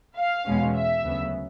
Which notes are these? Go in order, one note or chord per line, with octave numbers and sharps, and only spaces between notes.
F5
E2 B2 G#3 C#4
E5
D2 C#3 F#3 B3